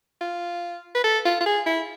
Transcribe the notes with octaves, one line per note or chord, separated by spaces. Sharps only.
F4
B4
A4
F4
F4
G#4
E4